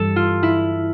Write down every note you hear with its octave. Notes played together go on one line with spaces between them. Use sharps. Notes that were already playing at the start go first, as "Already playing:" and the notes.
Already playing: G2 E3 G3 A4
F4
E4